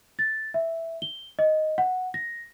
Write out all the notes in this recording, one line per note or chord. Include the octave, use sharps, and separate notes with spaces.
A6
E5
G7
D#5
F#5
A#6